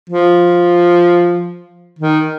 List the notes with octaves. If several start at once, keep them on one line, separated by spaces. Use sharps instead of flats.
F3
D#3